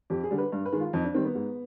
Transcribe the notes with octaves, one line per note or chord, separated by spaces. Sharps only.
F2 G4
G#4
D3 G3
B4
G2
B4
D#3 G#3
F4
F2 D#4
D4
D#3 G3 C4
B3
G#2